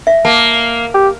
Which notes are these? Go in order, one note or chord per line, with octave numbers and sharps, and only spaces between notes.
E5
A#3 A5
G4